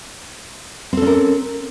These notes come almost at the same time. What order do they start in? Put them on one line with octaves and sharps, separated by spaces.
C4 A4 C#4 A#4